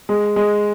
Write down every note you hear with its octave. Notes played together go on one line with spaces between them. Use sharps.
G#3
G#3